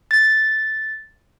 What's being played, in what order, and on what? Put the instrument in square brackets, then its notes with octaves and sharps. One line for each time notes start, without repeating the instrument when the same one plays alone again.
[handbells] A6